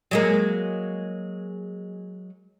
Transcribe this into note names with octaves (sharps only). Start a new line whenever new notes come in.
F#3 G#3 A#3